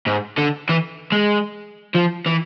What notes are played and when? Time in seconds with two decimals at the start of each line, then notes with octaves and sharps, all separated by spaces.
0.07 G#2
0.38 D3
0.69 E3
1.12 G#3
1.95 F3
2.26 E3